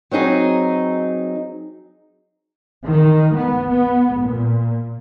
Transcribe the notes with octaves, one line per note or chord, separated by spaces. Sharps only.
F#3 C4 D#4 G#4
D#3
B3
B3
A#2